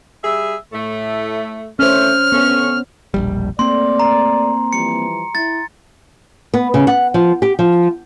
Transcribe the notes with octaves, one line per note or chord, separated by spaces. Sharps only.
G3 G#4 E5
A2 A3
D3 E3 A3 C#4 C5 F6
D3 A3 B3 C#4
E1 A#1 G3
A3 A#3 C4 D5 C6
A#5
E3 F3 G3 C#7
E4 A6
B3
C#3
F#5
F3
G4
F3